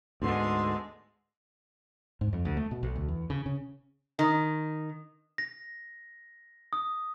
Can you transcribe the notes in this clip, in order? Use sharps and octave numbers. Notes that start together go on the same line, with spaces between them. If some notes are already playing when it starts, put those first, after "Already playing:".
D2 G#2 D3 G#3 B3 C6
G#2
F2
D2
A3
B2
B1
D2
E2
C#3
C#3
D#3
A#6
D#6